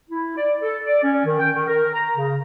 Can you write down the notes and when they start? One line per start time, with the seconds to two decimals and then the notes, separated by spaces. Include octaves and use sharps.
0.10 E4
0.37 D5
0.61 A4
0.86 D5
1.03 C#4
1.25 D#3
1.40 G5
1.54 D#3
1.67 A#4
1.94 A#5
2.17 C#3